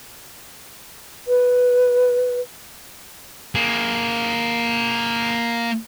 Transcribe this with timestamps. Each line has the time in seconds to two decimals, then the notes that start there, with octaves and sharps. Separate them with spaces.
1.28 B4
3.55 A#3 G#4